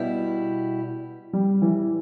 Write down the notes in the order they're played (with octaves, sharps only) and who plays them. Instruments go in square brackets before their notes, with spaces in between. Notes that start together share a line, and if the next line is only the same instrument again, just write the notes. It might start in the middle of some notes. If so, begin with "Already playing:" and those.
Already playing: [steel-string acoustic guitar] B2 G3 E4
[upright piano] G3
E3